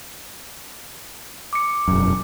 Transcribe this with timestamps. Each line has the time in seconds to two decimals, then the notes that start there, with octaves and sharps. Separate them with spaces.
1.53 D6 C#7
1.88 E1 F#2